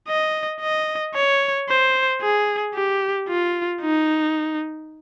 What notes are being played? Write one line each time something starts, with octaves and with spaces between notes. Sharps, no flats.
D#5
D#5
C#5
C5
G#4
G4
F4
D#4